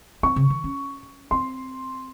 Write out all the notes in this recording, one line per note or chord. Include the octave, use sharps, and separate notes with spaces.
C4 C#6
C#3
D#3
C#4
C4 C6